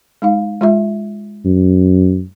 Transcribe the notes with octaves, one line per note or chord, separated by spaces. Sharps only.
G#3 D#4 F5
G#3 F4 E5
F#2